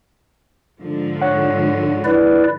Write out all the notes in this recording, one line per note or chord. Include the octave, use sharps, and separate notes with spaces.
G#2 D3 F3
C#5 F#5
E4 B4 D5